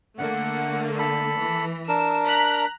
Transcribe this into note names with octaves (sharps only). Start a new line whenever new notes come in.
D3 A3 A#3 F#5
A4 B5
E3
D4 A#4 E6
A#5 F#6 B6